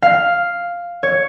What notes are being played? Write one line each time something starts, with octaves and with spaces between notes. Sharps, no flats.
F5
C#5